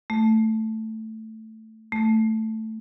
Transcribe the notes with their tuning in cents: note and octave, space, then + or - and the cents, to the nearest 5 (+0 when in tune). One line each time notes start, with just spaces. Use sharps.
A3 +5
A3 +5